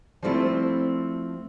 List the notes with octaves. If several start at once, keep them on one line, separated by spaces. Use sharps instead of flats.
F3 G3 A3 C4 E4 F4